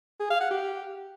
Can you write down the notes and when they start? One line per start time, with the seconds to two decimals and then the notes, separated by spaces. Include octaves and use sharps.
0.20 G#4
0.30 F5
0.40 F#5
0.51 G4